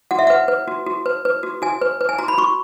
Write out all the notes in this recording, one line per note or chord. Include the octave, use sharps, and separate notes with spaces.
F#4 F#5
E5
B4 F#5
B4
F#4
F#4
B4
B4
F#4
F#4 G#5
B4
B4
G#5
F#4 A#5
B5
F#4 C#6